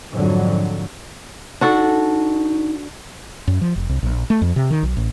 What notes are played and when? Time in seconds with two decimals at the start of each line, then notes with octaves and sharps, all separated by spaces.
0.12 F2 G#2 D3 F#3
1.61 D4 D#4 F#4 A4
3.47 F#2
3.61 F3
3.76 F1
3.89 C2
4.03 A#1
4.30 A3
4.42 F2
4.56 C3
4.71 D#3
4.83 B1
4.97 A1